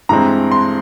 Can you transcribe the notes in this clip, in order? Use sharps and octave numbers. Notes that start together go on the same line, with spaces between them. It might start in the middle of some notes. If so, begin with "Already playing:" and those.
G2 E3 G#3 C4 A#5
C6